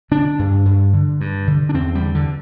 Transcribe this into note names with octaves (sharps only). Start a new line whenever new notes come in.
D3 D4
G2
G2
D3
G2
D3
D4
E2 C4
G3
D3
D3